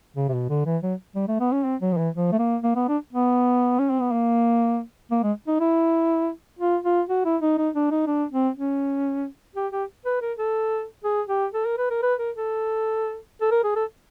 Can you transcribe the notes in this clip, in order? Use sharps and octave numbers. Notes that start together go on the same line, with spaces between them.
C#3
C3
B2
D3
E3
F#3
G3
A3
B3
C#4
C4
F#3
F3
E3
F3
A3
A#3
A#3
B3
D4
B3
C#4
C4
B3
A#3
A#3
G#3
D#4
E4
F4
F4
F#4
E4
D#4
D#4
D4
D#4
D4
C4
C#4
G4
G4
B4
A#4
A4
G#4
G4
A4
A#4
B4
A#4
B4
A#4
A4
A4
A#4
G#4
A4